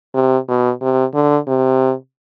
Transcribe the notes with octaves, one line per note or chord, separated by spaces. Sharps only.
C3
B2
C3
D3
C3